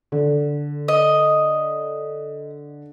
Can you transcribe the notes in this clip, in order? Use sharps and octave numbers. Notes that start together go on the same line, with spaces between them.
D3
D#5